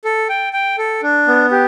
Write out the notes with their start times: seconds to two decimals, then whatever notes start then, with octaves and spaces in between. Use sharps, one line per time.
0.05 A4
0.29 G5
0.53 G5
0.78 A4
1.03 D4
1.27 B3
1.51 G4